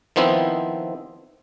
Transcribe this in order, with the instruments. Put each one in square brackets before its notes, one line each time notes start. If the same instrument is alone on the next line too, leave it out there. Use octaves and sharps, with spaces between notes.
[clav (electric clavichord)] D#3 F3 B3 C4 E4